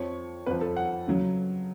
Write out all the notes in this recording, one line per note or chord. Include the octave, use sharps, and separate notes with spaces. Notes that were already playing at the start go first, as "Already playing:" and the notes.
Already playing: F2 F3 C#5
F2 F3 B4
A4
F#5
C#3 F#3